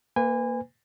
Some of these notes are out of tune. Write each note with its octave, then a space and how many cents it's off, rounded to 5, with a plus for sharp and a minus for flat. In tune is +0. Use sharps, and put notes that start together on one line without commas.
A#3 +0 B4 +35 G#5 -25